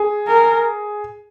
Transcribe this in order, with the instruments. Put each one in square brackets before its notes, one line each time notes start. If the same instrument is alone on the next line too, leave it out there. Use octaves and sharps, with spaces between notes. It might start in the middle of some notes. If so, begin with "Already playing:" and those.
Already playing: [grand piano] G#4
[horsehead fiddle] A#4